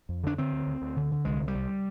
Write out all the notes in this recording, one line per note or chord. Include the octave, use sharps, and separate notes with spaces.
F2
D3 D4
D3 C4
D2
D2
D2
D3
D3
C2 G#3
C2
G3
C2